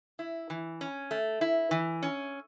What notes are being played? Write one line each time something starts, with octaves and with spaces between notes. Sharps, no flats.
E4
E3
C#4
A3
E4
E3
C#4